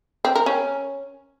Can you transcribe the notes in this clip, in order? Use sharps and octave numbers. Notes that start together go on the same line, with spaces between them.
C4
A#4
C#4